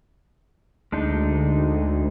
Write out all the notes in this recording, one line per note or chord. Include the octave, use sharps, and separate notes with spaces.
D2 G#3 D4 D#4